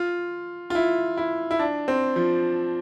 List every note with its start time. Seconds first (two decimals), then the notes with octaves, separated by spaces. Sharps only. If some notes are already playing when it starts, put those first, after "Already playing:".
Already playing: F4
0.70 F4
0.75 E4
1.18 E4
1.51 E4
1.59 D4
1.88 C4
2.16 F3